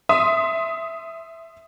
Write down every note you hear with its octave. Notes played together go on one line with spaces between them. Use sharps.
E5 C6 D#6